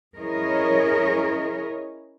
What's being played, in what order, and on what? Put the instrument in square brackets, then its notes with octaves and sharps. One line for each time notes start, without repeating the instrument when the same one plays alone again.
[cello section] C#4 E4 G#4 A#4 C#5 D#5